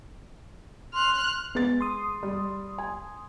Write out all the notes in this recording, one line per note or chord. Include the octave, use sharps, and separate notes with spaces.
C6 F6 F#6
G#3 B3 A6
C6 D#6
G3
G#5